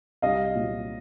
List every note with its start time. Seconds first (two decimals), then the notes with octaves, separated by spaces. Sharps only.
0.22 C2 D#5 F5
0.55 A#2 F#3